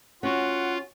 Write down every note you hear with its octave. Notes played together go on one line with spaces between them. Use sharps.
C#4 F4 F#4 F#5